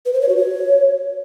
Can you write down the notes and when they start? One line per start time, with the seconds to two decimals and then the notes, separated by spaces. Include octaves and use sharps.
0.06 B4
0.13 C5
0.21 C#5
0.29 F#4
0.37 C#5